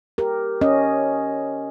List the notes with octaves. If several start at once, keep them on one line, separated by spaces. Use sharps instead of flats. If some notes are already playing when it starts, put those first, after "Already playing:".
G4 A#4
C#4 D#5